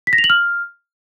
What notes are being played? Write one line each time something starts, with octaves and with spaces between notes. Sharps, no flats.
B6
A#6
F7
F#7
F6